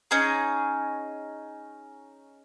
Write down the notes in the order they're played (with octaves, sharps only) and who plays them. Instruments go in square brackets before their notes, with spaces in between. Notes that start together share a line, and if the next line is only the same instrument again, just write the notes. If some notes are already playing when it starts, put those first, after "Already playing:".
[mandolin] C#4 D#4 G#4